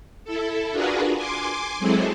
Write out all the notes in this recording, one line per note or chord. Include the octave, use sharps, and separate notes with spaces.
E4 A4
D4 F4 F#4 G#4 A#4 B4
G#5 C6 D6
F#3 G#3 C4 E4 G#4 A4